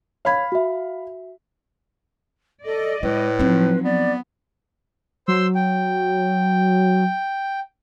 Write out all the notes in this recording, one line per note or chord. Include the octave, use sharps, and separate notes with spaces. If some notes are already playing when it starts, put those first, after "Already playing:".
C#5 F5 B5 G#6
F#4 E5
A4 D5 D#5
A2 G#3 B4
F3 F#3 C4 D#4
B3 D5
F#3 C5 C6 E6
G5